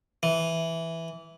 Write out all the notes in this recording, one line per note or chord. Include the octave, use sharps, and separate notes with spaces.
E3